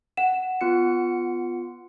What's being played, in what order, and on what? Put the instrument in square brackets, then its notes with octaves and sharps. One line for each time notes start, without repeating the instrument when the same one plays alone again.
[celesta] F#5 E7
[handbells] B3 F4 C#7